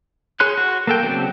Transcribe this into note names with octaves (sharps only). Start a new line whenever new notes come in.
G#4 C#5 C6 F#6
F#4
A#3 A4 G5
C#3 F#3 C4 D4